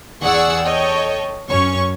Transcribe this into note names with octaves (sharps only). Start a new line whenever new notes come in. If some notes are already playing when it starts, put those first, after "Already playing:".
E2 G#4 D5 F#5 C#6 E6
A4 C#5 D#5 G5
F#2 C#4 C#5 C#6